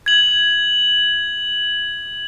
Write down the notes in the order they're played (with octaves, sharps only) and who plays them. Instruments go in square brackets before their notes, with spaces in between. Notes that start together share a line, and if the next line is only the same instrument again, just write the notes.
[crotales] G#6 F#7